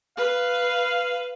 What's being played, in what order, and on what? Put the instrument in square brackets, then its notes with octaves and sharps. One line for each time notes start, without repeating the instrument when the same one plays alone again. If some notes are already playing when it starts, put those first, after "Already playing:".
[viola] B4 [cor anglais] F5